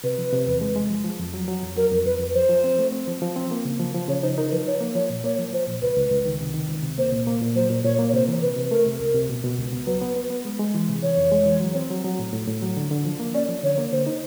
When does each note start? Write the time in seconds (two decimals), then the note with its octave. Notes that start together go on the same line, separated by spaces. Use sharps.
0.04 C3 B4
0.18 F3
0.33 C3
0.47 E2
0.61 G#3
0.76 G#3
0.90 F3
1.04 F3
1.19 F2
1.34 F#3
1.48 F#3
1.63 F2
1.77 F#3 A#4
1.91 F2
2.06 F2 B4
2.20 F2
2.35 F3 C5
2.49 F3
2.64 C4
2.79 A3
2.92 C4
3.07 F3
3.22 F3
3.36 C4
3.51 A#3
3.65 C#3
3.80 F3
3.95 F3
4.08 C#3 C#5
4.23 D#4 C5
4.37 D#4 A#4
4.52 F3 B4
4.66 F3 C#5
4.81 A#3
4.95 F3 C#5
5.10 A#2
5.24 A#3 C#5
5.39 F3
5.53 F3 C5
5.67 A#2
5.82 C#2 B4
5.97 C#2
6.11 C#2
6.26 D#3
6.40 C3
6.54 D#3
6.68 C#2
6.83 C3
6.98 A#3 C5
7.12 A#2
7.27 A#3
7.42 A#2
7.56 F#3 C5
7.70 A#2
7.84 A#2 C#5
7.99 A#3
8.09 C#5
8.13 C3 C5
8.28 E3
8.42 C3 B4
8.56 C3
8.71 A3 A#4
8.86 C3
9.00 C#2
9.15 C3
9.29 B2
9.44 B2
9.58 C#2
9.73 B3
9.87 F#3 B4
10.01 B3
10.16 B3
10.30 B3
10.45 G#3
10.59 G#3
10.75 E3
10.89 C3
11.03 E3 C#5
11.17 F2
11.32 G#3
11.46 E3
11.60 F#3
11.75 C4
11.90 F#3
12.05 F#3
12.19 A2
12.33 A2
12.48 A2
12.62 F#3
12.77 D3
12.91 D3
13.05 F3
13.20 A#3
13.34 C#4 D5
13.49 F3
13.63 D3 C#5
13.78 A#3
13.92 D3 C5
14.06 D#4